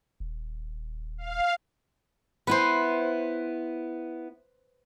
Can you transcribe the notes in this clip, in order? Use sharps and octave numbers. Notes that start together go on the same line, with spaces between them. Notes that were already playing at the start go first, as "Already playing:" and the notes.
D#1
F5
B3 E4 B4 C5